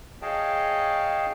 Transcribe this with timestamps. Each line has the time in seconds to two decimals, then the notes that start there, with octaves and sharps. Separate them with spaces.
0.22 G#4 C#5 D#5 F5 G5 A5